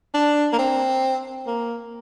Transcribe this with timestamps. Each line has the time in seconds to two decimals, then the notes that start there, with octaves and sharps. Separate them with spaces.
0.14 D4
0.53 A#3
0.59 C4
1.47 A#3